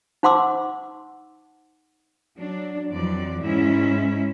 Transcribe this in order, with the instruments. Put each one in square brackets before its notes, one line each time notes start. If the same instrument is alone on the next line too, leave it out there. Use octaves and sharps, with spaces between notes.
[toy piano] D#4 C5 F#5 C6 D6 E6
[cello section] F#3 D4
F2 E3 F#3 D5
G#2 C#4 E4 E5